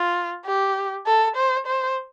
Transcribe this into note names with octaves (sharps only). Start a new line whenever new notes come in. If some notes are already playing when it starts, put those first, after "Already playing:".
Already playing: F4
G4
A4
C5
C5